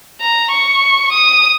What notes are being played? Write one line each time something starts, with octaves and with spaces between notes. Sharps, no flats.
A#5
C#6
D#6